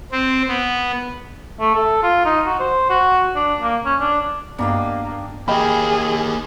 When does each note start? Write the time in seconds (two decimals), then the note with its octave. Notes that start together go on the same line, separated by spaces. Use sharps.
0.12 C4
0.48 B3
1.60 A3
1.75 A4
2.03 F4
2.25 D#4
2.46 F#4
2.60 C5
2.90 F#4
3.36 D4
3.62 A#3
3.85 C#4
4.00 D4
4.59 G2 A#3 B3 D4 G4 D#5
5.48 A#3 G4 G#4 D#5 G5 B5